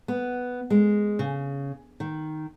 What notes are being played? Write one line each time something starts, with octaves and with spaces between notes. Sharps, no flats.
B3
G#3
C#3
D#3